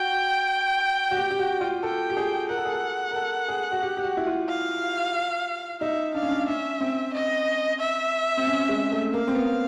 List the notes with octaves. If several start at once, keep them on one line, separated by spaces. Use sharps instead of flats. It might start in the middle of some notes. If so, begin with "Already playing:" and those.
Already playing: F#4 G5
F#4
G4
G4
F#4
F4
A4 G5
G4
G#4
A#4 F#5
A4
G#4
A4
A#4
A4
G#4
F#4
G4
G4
F#4
E4
F4
F5
D#4 E5
D4 F5
C#4
D4
C#4 E5
C4
D#5
E5
C4
C#4
G#3
A3
A#3 F5
C4
B3